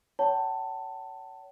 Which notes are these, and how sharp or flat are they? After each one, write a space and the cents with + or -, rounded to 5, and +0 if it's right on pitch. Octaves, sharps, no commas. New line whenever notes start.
C#5 +25 F#5 +45 A5 +15